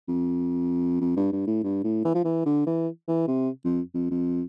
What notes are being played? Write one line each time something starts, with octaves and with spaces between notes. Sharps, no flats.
F2
F2
G2
G2
A2
G2
A2
E3
F3
E3
D3
E3
E3
C3
F2
F2
F2